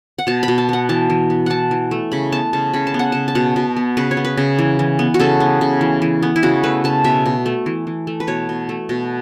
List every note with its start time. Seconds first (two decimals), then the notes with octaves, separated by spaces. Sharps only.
0.19 F#5
0.27 B2 A5
0.43 B5
0.48 B2
0.58 A5
0.69 B3 F#5
0.89 E3 A5
1.10 E3
1.30 B3
1.46 E3 F#5 A5
1.71 E3
1.91 A3
2.12 C#3 B5
2.32 B3 A5
2.53 C#3 A5
2.73 C#3 B5
2.87 A5
2.94 B3
2.99 F#5
3.12 C#3 A5
3.28 A5
3.35 B2 F#5
3.56 B2
3.77 B3
3.97 C#3 B4
4.11 C#5
4.17 B3
4.25 B4
4.37 C#3
4.59 E3
4.79 E3
4.99 B3
5.14 F#4
5.19 C#3 A4
5.40 B3
5.61 C#3
5.81 E3
6.02 E3
6.22 B3
6.36 E4
6.43 C#3 F#4
6.63 A3 B4
6.84 C#3 A5
7.04 B2 E5
7.26 B2
7.46 A3
7.66 E3
7.87 E3
8.07 A3
8.20 B4
8.27 B2 C#5
8.49 B2
8.69 A3
8.89 B2